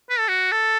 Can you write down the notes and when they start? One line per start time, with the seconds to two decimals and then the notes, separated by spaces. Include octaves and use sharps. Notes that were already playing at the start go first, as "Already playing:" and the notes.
0.10 B4
0.19 A4
0.28 F#4
0.52 A4